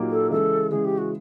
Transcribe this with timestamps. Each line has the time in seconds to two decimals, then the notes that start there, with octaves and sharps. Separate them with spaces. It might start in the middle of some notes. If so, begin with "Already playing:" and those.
Already playing: A#2 F#3 A#3 D#4 G4
0.10 A4
0.30 C#3 E3 G#3 A4
0.71 C#3 E3 G#3 G#4
0.84 G4
0.97 F#4